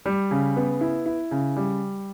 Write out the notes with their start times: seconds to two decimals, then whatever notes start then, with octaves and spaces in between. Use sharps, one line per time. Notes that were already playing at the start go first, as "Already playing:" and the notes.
0.06 G3
0.31 C#3
0.57 B3
0.81 E4
1.06 E4
1.31 C#3
1.56 G3